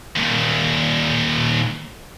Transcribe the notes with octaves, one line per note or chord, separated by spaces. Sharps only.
D#2 A#2